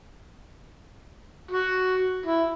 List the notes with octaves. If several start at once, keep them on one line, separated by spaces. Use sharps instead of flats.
F#4
E4